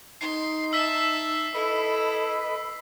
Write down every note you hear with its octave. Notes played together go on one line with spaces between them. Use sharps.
D#4 C6 C7
E5 A5 E6 B6
E4 A4 B4 D#5 B5